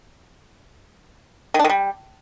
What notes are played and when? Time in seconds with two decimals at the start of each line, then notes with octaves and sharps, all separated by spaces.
1.54 D#3
1.59 D4
1.64 D#3
1.69 G3